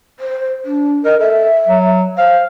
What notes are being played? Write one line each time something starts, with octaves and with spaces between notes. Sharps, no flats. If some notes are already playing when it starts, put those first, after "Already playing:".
C5
D4
A#4 D#5
A4 E5
F#3
C5 F5